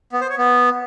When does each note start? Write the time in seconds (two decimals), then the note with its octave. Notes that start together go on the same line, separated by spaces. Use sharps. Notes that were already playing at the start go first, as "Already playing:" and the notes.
0.13 B3
0.21 C5
0.30 C#5
0.38 B3